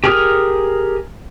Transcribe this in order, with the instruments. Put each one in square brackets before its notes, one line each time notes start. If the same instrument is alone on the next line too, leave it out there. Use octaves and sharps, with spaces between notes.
[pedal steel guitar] G4 G#4 A#4 D#6 F6